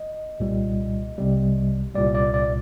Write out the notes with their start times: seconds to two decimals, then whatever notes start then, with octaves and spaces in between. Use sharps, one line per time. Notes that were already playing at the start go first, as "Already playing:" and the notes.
Already playing: D#5
0.40 C2 A#2 G3
1.18 C2 C3 G3
1.95 C2 A#2 G3 D5
2.15 D5
2.34 D5